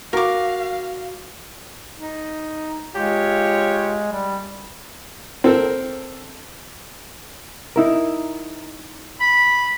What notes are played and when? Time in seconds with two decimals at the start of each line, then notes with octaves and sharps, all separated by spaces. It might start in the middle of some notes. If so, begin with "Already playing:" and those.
0.13 F#4 A#4 F5 D6
1.98 D#4
2.95 G#3 F4 G4 C#5
4.12 G3
5.44 C4 A4 A#4
7.76 D#4 E4 A#4
9.21 B5